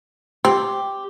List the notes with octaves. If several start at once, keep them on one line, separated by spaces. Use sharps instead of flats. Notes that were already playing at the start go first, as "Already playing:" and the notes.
C4 G4